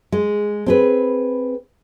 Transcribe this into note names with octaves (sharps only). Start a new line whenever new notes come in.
G#3
C4 G#4 B4